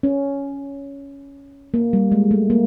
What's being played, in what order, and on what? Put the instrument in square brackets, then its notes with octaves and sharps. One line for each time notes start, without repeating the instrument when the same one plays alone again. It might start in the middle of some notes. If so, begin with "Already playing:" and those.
[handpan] C#4
A#3
G3
G#3
A3
A#3